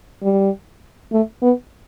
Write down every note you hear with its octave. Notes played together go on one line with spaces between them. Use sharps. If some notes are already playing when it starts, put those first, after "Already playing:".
G3
A3
B3